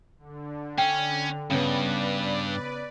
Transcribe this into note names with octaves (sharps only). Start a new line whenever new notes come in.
D3
C#4 G5
G2 C#3 B3 B4 D5